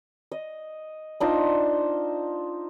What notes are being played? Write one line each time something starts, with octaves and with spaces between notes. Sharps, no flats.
D#5
D4 D#4 F4 C5